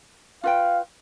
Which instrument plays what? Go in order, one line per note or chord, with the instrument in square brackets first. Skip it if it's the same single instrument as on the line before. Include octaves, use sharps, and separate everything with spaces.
[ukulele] F4 B4 G5 [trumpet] F5